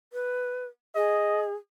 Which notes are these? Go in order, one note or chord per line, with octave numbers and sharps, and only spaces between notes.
B4
G#4 D#5